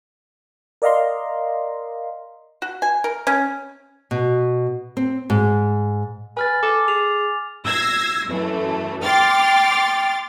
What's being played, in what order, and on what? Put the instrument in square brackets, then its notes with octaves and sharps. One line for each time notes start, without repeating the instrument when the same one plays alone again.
[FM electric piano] A#4 D5 D#5 F5 A#5 C6
[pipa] F#4
G#5
A#4
C#4
[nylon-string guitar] B2
C4
G#2
[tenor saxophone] B4 [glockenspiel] G#5 F6 A6
[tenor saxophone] A4 [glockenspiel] D6
[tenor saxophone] G#4 [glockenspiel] F7
[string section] E6 G#6 A#6 C7
F#2 E3 A3
G5 C6 D6 F6 A6